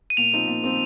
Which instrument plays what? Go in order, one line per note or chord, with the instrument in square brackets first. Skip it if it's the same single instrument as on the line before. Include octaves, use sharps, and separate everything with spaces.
[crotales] D#7
[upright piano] A#2 [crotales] F7
[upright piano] F3 C4 D#4
A#2
F3 C4 D#4